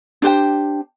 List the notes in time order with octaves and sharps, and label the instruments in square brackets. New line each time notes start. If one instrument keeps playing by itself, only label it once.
[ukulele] D4 G4 C5 G5